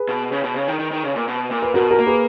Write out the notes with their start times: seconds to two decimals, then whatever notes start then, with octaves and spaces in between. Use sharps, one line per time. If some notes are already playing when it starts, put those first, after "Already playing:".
Already playing: G#4 B4
0.09 B2
0.32 C#3
0.44 B2
0.56 C#3
0.68 D#3
0.79 D#3
0.91 D#3
1.03 C#3
1.16 A#2
1.28 B2
1.51 A#2
1.62 B4
1.74 B2 F#4 A#4
1.90 F#4 A#4
1.99 A#3
2.07 G#4 B4